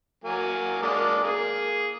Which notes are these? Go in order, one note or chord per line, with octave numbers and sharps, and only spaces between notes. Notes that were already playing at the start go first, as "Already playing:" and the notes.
F#3 A#3 G#5
G#3 A#3 D4
A#3 G#4